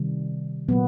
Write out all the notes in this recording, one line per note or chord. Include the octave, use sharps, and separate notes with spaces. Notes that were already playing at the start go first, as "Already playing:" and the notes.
Already playing: C3 D#3 G3
A#2 F#3 A#3 B3